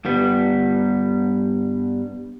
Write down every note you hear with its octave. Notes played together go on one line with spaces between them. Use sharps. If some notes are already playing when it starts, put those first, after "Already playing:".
G2 G3 B3